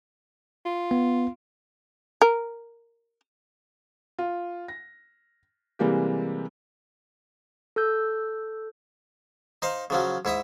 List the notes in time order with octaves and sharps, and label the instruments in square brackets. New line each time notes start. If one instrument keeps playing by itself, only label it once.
[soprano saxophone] F4
[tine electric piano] B3
[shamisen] A#4
[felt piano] F4
A#6
C3 E3 G3 G#3 A#3 G4
[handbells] A4 E6 G6
[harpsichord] D#4 C5 F5
C#3 F3 F#3
G#2 E4 E5 D#6